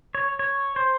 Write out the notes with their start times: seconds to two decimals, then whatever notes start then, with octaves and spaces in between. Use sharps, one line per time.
0.15 C#5
0.39 C#5
0.76 C5